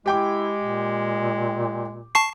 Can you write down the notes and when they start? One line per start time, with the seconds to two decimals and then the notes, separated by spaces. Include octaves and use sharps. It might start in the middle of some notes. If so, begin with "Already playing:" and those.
0.06 G#3 E4 G4 G5 D6
0.59 A#2
2.15 A5 C#6 C7